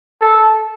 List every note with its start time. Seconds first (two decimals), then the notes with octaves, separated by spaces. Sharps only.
0.21 A4